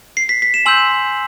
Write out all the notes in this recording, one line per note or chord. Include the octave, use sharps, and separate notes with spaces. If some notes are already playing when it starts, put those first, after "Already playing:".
C7
B6
B6
E7
G#5 C6 E6 G6 F#7